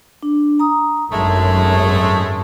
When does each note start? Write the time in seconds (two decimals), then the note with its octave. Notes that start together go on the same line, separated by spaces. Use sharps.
0.23 D4
0.59 A#5 D#6
1.12 G#1 F#2 G#3 A3 A5